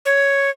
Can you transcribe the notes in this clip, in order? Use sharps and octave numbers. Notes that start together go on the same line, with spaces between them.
C#5